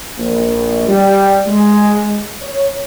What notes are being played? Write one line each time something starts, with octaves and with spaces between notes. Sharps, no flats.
A#1
G3
G#3
C#5